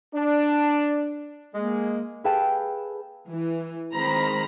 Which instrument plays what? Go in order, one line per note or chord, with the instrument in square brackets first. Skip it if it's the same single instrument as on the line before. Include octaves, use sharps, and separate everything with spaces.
[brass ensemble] D4
[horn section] G#3 [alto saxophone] A#3
[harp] G#4 A4 B4 F5 G5 A5
[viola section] E3
D#3 G#3 C4 C5 A#5 B5